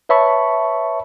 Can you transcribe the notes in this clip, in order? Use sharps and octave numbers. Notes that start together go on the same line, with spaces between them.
B4 C#5 E5 A5 B5 C#6